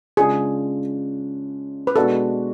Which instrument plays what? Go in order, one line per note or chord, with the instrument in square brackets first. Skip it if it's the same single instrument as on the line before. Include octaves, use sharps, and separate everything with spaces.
[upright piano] C#3 G#3 D4 F4 [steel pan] G#4
[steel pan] B4
[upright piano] B2 G#3 D4 F#4 [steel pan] A4